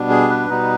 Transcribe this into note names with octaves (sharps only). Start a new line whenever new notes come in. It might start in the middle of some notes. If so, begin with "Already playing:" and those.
Already playing: B2 G3 B3 D4
G#4
B4
B2 G3 B3 D#4